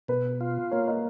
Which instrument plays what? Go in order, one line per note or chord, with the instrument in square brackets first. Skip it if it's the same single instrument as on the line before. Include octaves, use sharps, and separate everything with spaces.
[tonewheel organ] B2 [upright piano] B4
[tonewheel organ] F4
[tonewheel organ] A#3 [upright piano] C#5
[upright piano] D#5